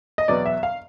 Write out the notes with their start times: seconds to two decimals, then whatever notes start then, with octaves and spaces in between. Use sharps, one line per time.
0.18 D#5
0.28 E2 B2 F#3 B3 D5
0.46 E5
0.63 F5